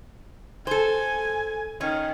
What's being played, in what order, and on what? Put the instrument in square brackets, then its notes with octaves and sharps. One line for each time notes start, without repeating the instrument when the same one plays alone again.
[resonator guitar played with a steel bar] A4 C5 [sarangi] G#5
[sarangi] D#3 [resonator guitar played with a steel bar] C#4